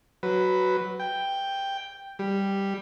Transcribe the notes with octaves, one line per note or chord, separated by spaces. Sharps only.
F#3 B4
G5
G3